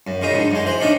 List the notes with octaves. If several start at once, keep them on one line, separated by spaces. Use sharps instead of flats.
F#2
A#2 C#3 D#4
G#2 D3
F#2 G#3
E3 C5
A2 D#3 D4 D#4